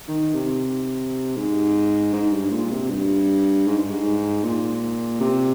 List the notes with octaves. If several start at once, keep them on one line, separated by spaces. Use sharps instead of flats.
D#3
C3
G#2
G#2
G2
A#2
C3
G2
G#2
G2
G#2
A#2
C3